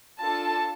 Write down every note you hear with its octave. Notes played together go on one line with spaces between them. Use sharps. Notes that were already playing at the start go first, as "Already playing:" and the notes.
D4 F4 A4 A5